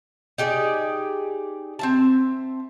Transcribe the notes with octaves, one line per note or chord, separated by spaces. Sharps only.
D#4 G4 G#4 D5
C4 E5 A5